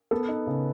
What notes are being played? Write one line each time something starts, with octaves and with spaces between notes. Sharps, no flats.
B3 A4 B4
D#4
C#3